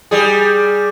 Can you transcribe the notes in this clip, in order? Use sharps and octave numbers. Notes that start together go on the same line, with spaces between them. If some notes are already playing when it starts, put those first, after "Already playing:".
G3 G#4